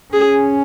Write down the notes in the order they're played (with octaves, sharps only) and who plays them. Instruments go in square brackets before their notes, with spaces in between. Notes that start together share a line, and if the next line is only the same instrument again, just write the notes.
[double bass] C#4 [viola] G#4